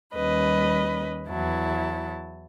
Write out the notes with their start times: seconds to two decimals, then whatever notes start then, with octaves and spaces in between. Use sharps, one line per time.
0.13 D#2 G3 C#4 B4 D#5 B5
1.28 E2 F#3 E4 A5